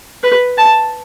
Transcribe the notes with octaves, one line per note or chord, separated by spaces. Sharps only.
B4
A5